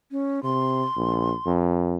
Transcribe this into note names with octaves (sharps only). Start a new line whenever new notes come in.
C#4
C3 C6
A#1
F2